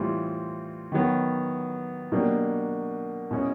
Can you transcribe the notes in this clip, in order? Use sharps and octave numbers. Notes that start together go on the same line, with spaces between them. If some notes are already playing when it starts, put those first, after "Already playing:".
Already playing: A2 E3 G3 C4 F4
D#3 F#3 B3
B2 F#3 A#3 D4 G4
B2 G#3 C#4 E4 G#4